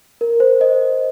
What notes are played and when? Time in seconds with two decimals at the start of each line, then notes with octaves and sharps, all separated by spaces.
0.21 A#4
0.40 C5
0.61 D#5